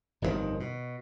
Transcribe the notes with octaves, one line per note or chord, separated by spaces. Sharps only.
G1 F2 G#2 D#3
B2